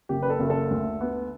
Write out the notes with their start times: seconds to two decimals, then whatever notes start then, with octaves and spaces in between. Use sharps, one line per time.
0.09 F#1 G4
0.22 B4
0.30 A4
0.40 F#1
0.50 A4
0.70 D2
1.01 B3